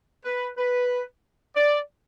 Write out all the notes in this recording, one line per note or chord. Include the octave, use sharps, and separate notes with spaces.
B4
B4
D5